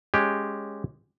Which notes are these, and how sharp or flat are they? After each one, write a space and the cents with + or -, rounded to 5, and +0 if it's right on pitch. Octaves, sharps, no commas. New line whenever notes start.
G#3 +0 C#4 +0 G4 +5